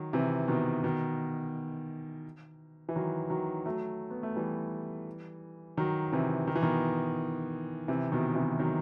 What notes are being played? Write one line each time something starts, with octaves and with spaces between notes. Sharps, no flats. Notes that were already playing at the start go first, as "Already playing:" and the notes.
Already playing: D#3 F#3
C3 E3
B2 D#3
B2 D#3
E3
D#3 F#3
D#3 F#3
F#3 A3
B3
A3
E3 G3
D#3 F#3
C3 E3
D#3
E3
B2 D#3
C3 E3
B2 D#3
C3 E3
D#3 F#3